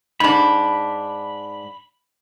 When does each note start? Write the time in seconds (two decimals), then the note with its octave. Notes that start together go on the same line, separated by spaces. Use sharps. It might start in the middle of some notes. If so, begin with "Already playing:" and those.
0.20 G#2 D4 B5